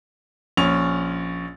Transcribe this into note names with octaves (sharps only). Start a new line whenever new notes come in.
A#1 C#4 C#6 F7